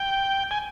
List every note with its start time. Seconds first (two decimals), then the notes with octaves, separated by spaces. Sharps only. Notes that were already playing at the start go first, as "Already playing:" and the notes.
Already playing: G5
0.51 G#5